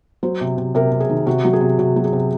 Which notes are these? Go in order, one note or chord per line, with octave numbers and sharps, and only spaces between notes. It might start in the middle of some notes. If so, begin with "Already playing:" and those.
F#3 C5
C3
C3
C3 A#4
C3
G#4
D#3
C3 F#4
F#3
G#4
C3
C3 F#4
F#3
G#4
C3